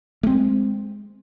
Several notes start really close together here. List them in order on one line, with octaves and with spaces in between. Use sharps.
A3 C4 G#3